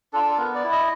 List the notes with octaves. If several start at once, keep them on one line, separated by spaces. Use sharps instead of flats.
D4 F4 A4
B3 A#4
D5
E4
D#5